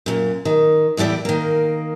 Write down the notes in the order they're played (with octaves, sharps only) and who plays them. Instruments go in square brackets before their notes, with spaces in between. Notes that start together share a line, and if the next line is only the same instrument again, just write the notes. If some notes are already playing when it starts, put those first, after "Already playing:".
[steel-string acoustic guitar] F#2 A#2
D#3
E2 A2 G3 E4 D5
D#3 A#3